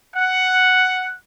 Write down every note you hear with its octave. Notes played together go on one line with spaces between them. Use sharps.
F#5